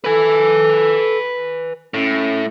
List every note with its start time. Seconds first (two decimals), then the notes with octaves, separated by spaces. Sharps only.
0.04 A4 B4 G#5
1.94 A2 C#4